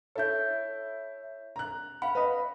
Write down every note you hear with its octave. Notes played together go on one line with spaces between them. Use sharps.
E4 A4 C#5 G6
A#5 F#6
F5 F#5 B5
B4 D#5